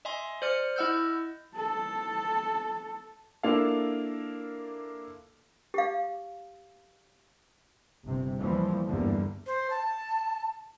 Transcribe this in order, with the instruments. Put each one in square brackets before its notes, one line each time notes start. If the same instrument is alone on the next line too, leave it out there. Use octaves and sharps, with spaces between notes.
[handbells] D#5 E5 G#5 C6
C5 D5 F6 C#7
E4 D#5 F#5 E6 F6 G6
[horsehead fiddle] A4 A5
[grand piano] A#3 D4 E4 F4 A4 F5
[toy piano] G4 F5
[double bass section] G1 C3
D#2 A2 E3 F3 G3
G1 E2 G#2 D3 G3 A#3
[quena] C5
A5